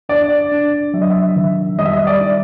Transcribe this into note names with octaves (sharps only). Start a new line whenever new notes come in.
D4 D5
D4
F#3 E5
D#5
E5
D#3
G3 D#5
E5
D#5
D5
D#4